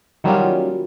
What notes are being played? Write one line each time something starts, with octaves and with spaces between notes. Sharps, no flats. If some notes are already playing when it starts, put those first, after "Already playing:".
D#3 F#3 G3 A#3 C#4 F4